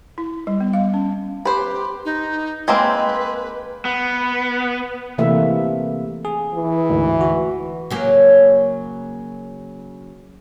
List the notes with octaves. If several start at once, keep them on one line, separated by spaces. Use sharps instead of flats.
E4
G3
B3
F5
C#4
G4 B4 C5
D#4
G#3 A#3 C4 B4
B3
C3 E3 A3 A#3 E5
G#4
E3
D2 G#2
F#4
C#3 F#3 A#3